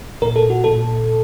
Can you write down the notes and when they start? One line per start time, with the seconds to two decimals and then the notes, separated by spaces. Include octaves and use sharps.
0.22 A#2 A#4
0.36 A4
0.50 F#4
0.64 A#2 A4